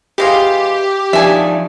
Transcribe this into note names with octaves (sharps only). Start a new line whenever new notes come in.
E3 G#3 F4 G4
F3 D4 D#4 E5 G#5